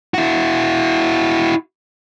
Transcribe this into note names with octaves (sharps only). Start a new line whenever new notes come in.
E4 F#4